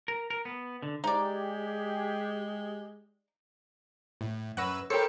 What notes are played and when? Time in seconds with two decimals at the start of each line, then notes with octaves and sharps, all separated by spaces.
0.08 A#4
0.30 A#4
0.45 B3
0.82 D3
1.04 G#3 D#4 G4 G#4 D5
4.21 A2
4.57 F#2 B4 F#5 C#6 E6 A#6
4.90 G4 A4 A#4 C5 C#5 G5 C#7